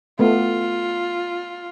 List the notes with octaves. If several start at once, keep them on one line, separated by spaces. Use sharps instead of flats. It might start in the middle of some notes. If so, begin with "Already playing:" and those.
A3 B3 F4